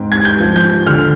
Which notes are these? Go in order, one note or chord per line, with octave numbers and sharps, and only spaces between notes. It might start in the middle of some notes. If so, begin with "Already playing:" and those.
Already playing: G#2 C4
G#6
G6
F3
G6
D3 F6